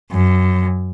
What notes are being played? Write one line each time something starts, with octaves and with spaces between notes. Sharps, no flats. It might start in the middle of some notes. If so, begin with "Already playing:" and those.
F#2